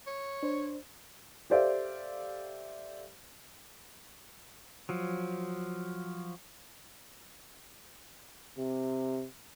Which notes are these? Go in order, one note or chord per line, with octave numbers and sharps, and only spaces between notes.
C#5
D4 C5
G4 A4 C5 D5 E5 F5
F3 F#3
C3